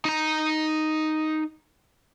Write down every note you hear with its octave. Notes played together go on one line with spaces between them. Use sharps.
D#4 A#5